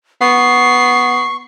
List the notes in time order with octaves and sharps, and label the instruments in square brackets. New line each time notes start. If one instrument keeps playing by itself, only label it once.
[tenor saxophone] B3 [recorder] C#6 [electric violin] C7